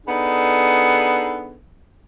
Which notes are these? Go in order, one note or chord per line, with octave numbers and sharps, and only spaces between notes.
B3 D4 D#4 G#4 A4